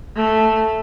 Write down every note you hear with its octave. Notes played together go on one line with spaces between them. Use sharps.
A3